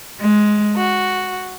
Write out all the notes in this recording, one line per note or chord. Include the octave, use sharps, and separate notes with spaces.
G#3
F#4